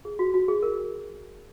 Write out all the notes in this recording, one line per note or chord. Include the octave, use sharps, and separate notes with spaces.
G#4
F#4
F#4
G#4
A#4